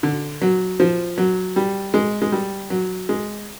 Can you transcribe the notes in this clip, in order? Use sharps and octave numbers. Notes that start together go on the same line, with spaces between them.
D3
F#3
F3
F#3
G3
G#3
G#3
G3
F#3
G#3